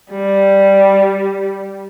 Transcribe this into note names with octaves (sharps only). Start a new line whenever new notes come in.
G3